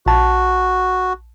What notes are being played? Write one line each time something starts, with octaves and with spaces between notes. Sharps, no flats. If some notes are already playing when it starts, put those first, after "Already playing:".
A#1 F#4 A5